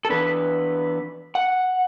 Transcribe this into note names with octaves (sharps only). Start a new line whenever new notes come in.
A4
E3 B3 D4 B4
F#5